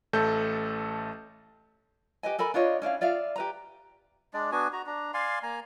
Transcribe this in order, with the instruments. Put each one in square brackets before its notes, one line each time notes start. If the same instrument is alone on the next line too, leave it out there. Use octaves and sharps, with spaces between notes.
[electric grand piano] A1 A3 A4 G6
[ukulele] G4 B4 D#5 G#5
A4 A#4 G#5 B5
D4 F4 C#5 D#5
C#4 D4 E4 F5
F4 D5 E5 F5
G4 B4 A#5
[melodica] G#3 D4 D5
B3 D4 F#4 G#5
F#4 A#5
D4 A#5
D5 F5 G#5 C6
A#3 G#5 A#5